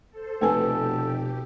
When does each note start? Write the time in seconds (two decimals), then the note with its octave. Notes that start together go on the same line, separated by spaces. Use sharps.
0.11 A4 C5
0.41 F1 B2 A3 G4 A4 B4 G#5